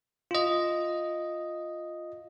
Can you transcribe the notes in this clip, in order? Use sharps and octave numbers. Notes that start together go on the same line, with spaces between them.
F4 D#5